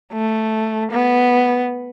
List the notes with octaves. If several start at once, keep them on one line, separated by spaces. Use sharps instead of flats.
A3
B3